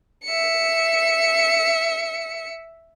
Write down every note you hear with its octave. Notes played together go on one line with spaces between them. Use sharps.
E5 C#7